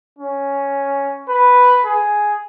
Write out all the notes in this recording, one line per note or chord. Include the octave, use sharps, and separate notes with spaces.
C#4
B4
G#4